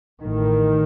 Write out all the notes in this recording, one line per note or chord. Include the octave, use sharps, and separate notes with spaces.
A1 A2 D#3